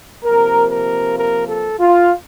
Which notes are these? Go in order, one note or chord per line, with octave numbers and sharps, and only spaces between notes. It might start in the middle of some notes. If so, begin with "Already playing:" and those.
C3 F3 A#3 A#4
A#4
A#4
A4
F4